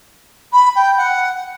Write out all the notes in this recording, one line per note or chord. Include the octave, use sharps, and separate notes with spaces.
B5
G5
F#5